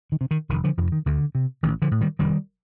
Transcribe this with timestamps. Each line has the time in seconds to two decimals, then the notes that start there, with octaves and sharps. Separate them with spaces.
0.12 D#3
0.21 C3
0.31 D#3
0.49 F1 D#3
0.64 D3 F3
0.77 F2 D#3
0.82 C3
0.92 D#3
1.06 D2 D3
1.35 C3
1.63 A1 D#3
1.82 D3 F3
1.91 A2
2.01 D#3 G3
2.19 F1 D#3 G3